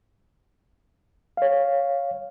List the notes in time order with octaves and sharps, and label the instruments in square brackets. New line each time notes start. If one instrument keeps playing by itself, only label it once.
[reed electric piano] C#5 F5